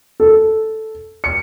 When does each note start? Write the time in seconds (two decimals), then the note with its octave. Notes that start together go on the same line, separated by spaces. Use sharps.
0.20 A4
1.24 C#7